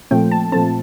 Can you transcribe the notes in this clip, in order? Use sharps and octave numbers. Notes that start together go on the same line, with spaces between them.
A#2 F3 A3 C4 G5
A5
A#2 F3 A3 C4 A5